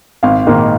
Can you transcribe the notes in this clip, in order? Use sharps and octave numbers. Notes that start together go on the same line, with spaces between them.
G#1 F5
G#2 D#3 A#3